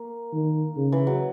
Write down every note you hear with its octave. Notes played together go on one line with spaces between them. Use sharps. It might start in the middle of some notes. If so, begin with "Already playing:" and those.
Already playing: A#3
D#3
C#3
E3
F#3